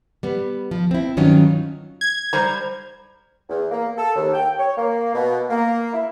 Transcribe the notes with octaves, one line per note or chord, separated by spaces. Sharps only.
G3 B3
F3
C4 E4
G2 D#3 F#3 C#4 F4
G#6
G3 C5 A#5
E2
A#3
A4
D#2
G5
C#5
A#3
B2
A#3
E4